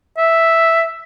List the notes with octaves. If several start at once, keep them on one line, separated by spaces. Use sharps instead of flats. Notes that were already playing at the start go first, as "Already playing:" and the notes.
E5